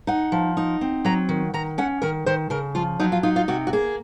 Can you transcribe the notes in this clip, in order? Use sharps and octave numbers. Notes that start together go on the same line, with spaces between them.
D#4 F#5
F3
D#4
C4
F#3 A#5
D#3
D#3 A#5
C#4 F#5
D#3 A#4
D#3 C5
C#3 A#4
F3 F4
F#3 D#4
F4
D#4 F4
F4
C3 F#4
F#4
A#3 G#4